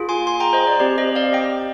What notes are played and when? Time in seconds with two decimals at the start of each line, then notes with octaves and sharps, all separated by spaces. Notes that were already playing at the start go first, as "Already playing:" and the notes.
Already playing: A#3 F4 G#4
0.09 G#5 C6
0.27 G#5 C6
0.40 G5 A#5
0.53 C5 D#5
0.67 D5
0.80 C4 G4 D5
0.98 C5 D#5
1.15 D5 F5
1.33 D#5 G5